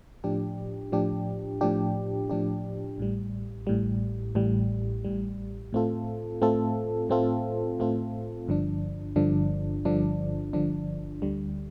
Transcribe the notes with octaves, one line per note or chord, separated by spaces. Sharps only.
A2 F3 D4 G4
A2 F3 D4 G4
A2 F3 D4 G4
A2 F3 D4 G4
A1 A2 G3
A1 A2 G3
A1 A2 G3
A1 A2 G3
A2 A3 C4 F4 A4
A2 A3 C4 F4 A4
A2 A3 C4 F4 A4
A2 A3 C4 F4 A4
G1 G2 D3 F3 D4
G1 G2 D3 F3 D4
G1 G2 D3 F3 D4
G1 G2 D3 F3 D4
D2 D3 G3